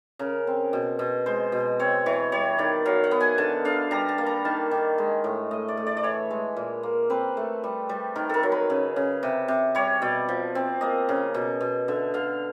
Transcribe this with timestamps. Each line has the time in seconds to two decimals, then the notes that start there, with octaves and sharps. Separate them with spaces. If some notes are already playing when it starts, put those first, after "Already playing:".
0.19 C#3 A#4
0.47 C4
0.73 B2
0.99 B2
1.26 G#3 C5
1.52 B2
1.79 C4 C#5
2.06 E3 C#5
2.32 G3 C#5
2.58 D#3 D5
2.85 F#3 F5
3.04 F#5
3.11 B3
3.21 G#5
3.38 D3 A5
3.65 D3 F5
3.91 G3 A#5
4.09 A5
4.18 A#3
4.26 A#5
4.45 D#3 A5
4.71 D#3
4.98 G#3
5.24 A2
5.51 A3 D#5
5.68 D5
5.77 A3
5.87 D5
5.97 D5
6.03 E3 C#5
6.30 G#3
6.57 A#2
6.83 A#3
7.10 C4 B4
7.37 A3
7.64 G3
7.89 G3
8.16 D#3 A#4
8.29 A4 A#4
8.43 F#3
8.52 B4
8.70 C#3
8.96 C#3
9.23 C3
9.48 C3
9.75 G3 C#5
10.02 B2 D5
10.29 F3
10.55 C4
10.81 A#3 D#5
11.09 C#3
11.34 B2
11.61 B2
11.88 D3 E5
12.14 D3 F5